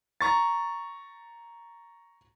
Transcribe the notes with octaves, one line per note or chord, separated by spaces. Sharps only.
A#5 C#6 A6